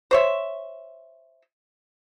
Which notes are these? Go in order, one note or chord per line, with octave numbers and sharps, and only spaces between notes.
C5 C#5 E5